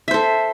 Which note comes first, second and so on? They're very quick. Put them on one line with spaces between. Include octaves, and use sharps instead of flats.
E5 C5 A4